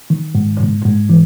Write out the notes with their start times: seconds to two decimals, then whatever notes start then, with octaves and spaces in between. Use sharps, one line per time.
0.10 D#3
0.35 G#2
0.60 G#2
0.85 G#2
1.10 E3